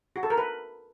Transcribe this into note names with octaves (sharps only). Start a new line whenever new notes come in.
F#4
A4
A#4
B4